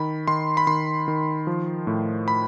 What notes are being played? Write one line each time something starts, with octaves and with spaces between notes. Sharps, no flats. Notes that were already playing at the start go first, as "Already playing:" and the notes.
Already playing: D#3 B5
D#3 C6
B5
D#3 C6
D#3
F3
A2
B5